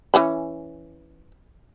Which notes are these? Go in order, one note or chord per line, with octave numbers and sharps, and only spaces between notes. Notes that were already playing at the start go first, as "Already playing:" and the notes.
E3 C#4 B5